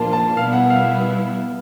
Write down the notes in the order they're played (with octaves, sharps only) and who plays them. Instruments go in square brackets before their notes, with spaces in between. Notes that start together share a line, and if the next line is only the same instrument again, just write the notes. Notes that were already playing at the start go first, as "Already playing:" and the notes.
Already playing: [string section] A#2 F3 A#3 D4 F4 [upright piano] A5
[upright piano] A5
[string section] B2 G3 B3 E4 [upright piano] F5
[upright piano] F#5
F5